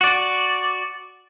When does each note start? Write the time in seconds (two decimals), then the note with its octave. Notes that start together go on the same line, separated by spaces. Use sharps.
0.01 F#4 D5